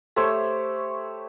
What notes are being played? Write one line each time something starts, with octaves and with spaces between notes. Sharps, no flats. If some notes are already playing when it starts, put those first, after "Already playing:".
A3 G4 C5 C#5